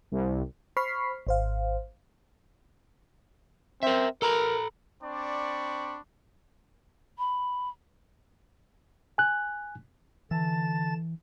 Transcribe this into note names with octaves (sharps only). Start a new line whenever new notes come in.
C2
C5 B5 C#6 F6 B6 C7
G#1 C5 F5
C4 A#4 E5
A4 A#4 A#5 B5
C4 D4 D5 B5 C#6
B5
G#5 F#6
D3 E3 A5 A6